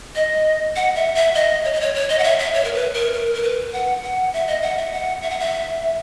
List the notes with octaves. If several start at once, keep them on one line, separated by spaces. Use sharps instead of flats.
D#5
F#5
E5
E5
D#5
C#5
D#5
C#5
C#5
D#5
F#5
E5
E5
C#5
A#4
B4
A#4
A#4
A#4
B4
F#5
F#5
E5
D#5
F#5
E5
F#5
E5
F#5
E5